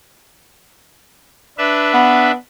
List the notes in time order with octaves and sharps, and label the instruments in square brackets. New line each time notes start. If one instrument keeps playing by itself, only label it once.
[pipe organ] D4 B4 E5
[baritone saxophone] B3